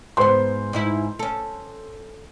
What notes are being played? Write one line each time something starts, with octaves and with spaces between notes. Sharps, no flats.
G#2 B3 B4 C5 C6
G#2 D#4 E4
C#4 A4